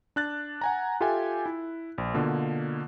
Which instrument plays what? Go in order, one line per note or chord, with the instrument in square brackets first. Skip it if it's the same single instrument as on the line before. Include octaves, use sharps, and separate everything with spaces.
[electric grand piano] D4 F#6 A6
F#5 G#5 A#5
F4 G4 A4 E5 G5 G#5
E4
A#1
B2 D3 A#3 F4